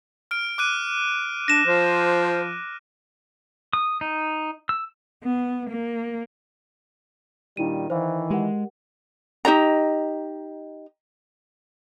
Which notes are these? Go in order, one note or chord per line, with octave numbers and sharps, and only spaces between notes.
F6 D7
D6 F#6 D#7
D4 A#6 E7
F3 C5
D#6
D#4
E6
B3
A#3
A#2 D#3 G3 D4 E4 D#7
D#3 E3 C5 D5 F5
G#3 G4 A#4 F#5
D#4 G4 D#5 A#5